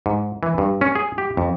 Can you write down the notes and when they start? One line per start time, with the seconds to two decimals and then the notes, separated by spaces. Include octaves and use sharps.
0.06 G#2
0.43 E3
0.58 G2
0.81 C#4
0.95 G#4
1.18 G4
1.37 F2